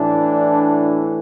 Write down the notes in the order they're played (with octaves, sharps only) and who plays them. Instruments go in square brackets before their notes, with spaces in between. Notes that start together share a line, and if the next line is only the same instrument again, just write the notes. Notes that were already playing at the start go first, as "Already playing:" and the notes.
Already playing: [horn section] A2 E3 D4